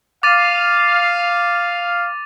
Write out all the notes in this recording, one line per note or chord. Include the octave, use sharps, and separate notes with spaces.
F5 D6 A6 D#7